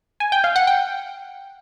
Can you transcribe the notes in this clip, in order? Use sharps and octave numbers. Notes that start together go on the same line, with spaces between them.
G#5
G5
F5
F#5
G5